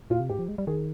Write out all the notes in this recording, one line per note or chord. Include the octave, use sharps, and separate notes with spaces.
A#2 F4
C3
G#2 G4
F3
G#3
G3
D#3 G#4